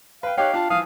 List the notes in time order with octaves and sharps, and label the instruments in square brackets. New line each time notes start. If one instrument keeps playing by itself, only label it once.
[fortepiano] B4 G5 [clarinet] F5
[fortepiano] D#4 G4 F#6 [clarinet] C#5 [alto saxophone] F5 [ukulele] G5
[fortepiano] D4 A5 [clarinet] F4
[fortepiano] E3 F3 [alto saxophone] F5 [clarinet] D#6